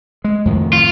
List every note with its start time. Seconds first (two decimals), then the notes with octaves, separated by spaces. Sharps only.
0.24 G#3
0.45 F2 A2 D#3
0.73 F4